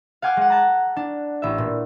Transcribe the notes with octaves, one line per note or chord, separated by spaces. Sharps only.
F5 F#5 G#5 D6 F6 G6
G#3 F#5
A5 A#5
D4
A1 E5
A#2